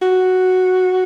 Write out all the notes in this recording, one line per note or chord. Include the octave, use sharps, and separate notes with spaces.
F#4